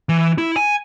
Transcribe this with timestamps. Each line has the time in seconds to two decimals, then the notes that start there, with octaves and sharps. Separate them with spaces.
0.09 E3
0.38 E4
0.56 G#5